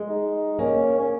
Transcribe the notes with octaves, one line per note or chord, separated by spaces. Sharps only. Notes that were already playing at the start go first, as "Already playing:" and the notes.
Already playing: G#3
D#4
A#3 C#4
C#4